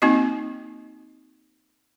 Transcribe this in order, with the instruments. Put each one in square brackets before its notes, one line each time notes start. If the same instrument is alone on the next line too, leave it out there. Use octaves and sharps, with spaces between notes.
[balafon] A#3 C4 D#4 F#4 D#5